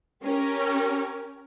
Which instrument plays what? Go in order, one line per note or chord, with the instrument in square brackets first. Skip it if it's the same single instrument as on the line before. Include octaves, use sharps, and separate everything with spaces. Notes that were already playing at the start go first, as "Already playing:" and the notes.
[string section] C#4 G4 A#4